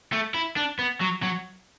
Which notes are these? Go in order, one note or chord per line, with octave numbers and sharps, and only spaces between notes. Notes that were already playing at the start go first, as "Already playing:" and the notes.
A3
E4
D4
B3
F#3
F#3